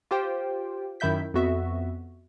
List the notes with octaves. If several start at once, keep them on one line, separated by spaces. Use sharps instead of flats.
F4 G4 C5 G5
F#2 D#3 E4 E5 G6 B6
F2 B3 F#4 E5